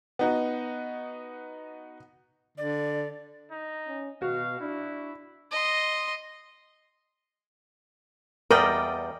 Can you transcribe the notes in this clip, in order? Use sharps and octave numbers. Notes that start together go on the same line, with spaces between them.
B3 D#4 F#4
D3 D5
D#4
C#4
B2 F#4 F5
D4 E4
D#5 C6
E2 G3 A#4 D5 D#5 G5